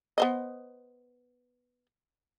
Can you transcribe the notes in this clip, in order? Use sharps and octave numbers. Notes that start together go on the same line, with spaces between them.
B3 C5 D#5